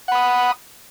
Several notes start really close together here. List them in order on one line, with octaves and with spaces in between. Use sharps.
F#5 B5 D#6